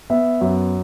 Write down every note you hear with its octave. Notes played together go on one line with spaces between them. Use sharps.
B3 E5
F#2